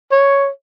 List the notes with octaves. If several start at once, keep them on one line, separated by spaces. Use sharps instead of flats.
C#5